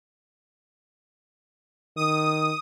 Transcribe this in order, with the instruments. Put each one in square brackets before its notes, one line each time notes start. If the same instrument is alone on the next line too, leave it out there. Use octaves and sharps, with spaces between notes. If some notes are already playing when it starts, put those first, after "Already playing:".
[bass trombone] D#3 [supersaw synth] D#6